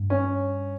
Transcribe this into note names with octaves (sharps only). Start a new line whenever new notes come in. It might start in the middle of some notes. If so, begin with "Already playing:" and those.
Already playing: G2
C#4